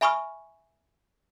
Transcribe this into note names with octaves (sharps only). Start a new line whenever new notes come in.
E5 G#5 B5 C#6 D#6 F6